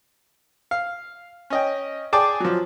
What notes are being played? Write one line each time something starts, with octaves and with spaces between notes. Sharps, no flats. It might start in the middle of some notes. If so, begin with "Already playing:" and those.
F5
C#4 D#5 G5
G#4 D5 G5 A5 D6
F3 F#3